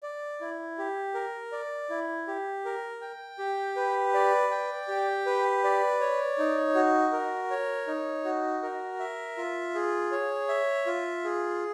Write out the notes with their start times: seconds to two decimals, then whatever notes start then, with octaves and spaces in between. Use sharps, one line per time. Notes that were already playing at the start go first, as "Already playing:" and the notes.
0.03 D5
0.41 E4
0.78 G4
1.14 A#4
1.52 D5
1.90 E4
2.28 G4
2.65 A#4
3.01 G5
3.39 G4
3.76 B4
4.14 D5
4.51 G5
4.88 G4
5.26 B4
5.64 D5
6.01 C#5
6.38 D#4
6.75 F#4
7.12 A#4
7.51 C#5
7.87 D#4
8.25 F#4
8.63 A#4
8.99 E5
9.37 F4
9.75 G#4
10.12 C#5
10.49 E5
10.86 F4
11.24 G#4